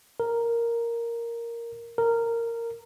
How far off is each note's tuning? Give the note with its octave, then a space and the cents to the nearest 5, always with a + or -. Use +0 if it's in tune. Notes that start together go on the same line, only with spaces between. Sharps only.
A#4 +0
A#4 -10